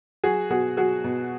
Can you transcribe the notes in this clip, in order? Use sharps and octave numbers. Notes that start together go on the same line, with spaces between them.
F#3 F#4 G#4
B2 F#4 G#4
F#3 F#4 G#4
B2